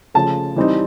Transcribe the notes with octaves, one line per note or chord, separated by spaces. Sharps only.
C#3 F3 A3 A5
E3 G3 C4 D#4